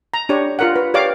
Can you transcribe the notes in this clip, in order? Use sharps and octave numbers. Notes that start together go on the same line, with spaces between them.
A#5
D4 G4 C#5
F4 A#4 F#5
B4
G4 C#5 D5 F5 D6